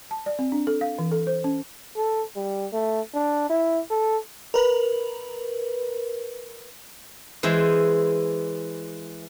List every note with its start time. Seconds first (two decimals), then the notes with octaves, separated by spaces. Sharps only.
0.11 A5
0.26 D5
0.39 C4
0.52 D4
0.67 A4
0.81 F5
0.99 E3
1.11 A4
1.27 C5
1.44 C#4
1.96 A4
2.36 G3
2.73 A3
3.14 D4
3.49 E4
3.90 A4
4.54 A#4 B4
7.43 E3 G#3 C5 E5